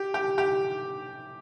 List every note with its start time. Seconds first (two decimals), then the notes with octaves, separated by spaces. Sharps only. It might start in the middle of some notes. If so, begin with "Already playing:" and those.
Already playing: G4
0.14 G4
0.38 G4